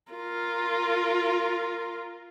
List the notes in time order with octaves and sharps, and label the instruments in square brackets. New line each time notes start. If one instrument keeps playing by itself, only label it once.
[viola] F4 A#4